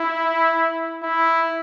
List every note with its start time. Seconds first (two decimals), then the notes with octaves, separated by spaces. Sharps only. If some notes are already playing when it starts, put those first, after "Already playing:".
Already playing: E4
1.03 E4